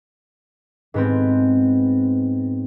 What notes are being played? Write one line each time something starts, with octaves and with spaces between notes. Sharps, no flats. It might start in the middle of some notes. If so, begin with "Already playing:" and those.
G#2 B3 C4